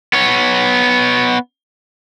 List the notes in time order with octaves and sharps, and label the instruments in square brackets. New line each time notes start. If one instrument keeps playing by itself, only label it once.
[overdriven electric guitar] B3 C#5